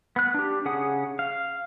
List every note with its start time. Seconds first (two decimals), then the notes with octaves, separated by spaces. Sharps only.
0.16 B3 F#6
0.34 D4 G4
0.65 C#3 C#4 G#4 F#5 D#6
1.19 F5